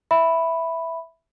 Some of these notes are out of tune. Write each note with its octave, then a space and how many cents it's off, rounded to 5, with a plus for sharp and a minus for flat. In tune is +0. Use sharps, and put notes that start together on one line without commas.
E5 +0 B5 +0